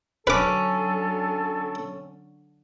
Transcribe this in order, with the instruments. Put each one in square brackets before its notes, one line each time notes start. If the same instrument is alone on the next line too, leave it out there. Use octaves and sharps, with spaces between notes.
[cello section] D3 F#3 [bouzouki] C#4 [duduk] A4 [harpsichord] B4 D6